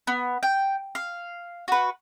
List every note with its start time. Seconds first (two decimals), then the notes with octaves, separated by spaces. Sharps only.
0.07 B3
0.43 G5
0.95 F5
1.68 F#4 B4